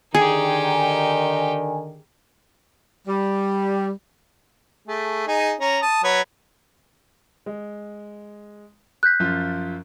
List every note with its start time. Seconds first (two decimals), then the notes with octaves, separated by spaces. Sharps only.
0.15 D3 D#3 D#4 G4 G#4 G#5
3.08 G3
4.88 A3 G#4
5.27 D#4 G#4 G#5
5.60 C#4 A#5
5.82 A5 D#6
6.04 F#3 B4 C#5
7.46 G#3
9.03 F#6 G6 B6
9.20 F#2 F3 F4